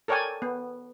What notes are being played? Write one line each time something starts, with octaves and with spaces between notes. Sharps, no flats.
A4 A#4 C#5 D5 G5 G#5
B3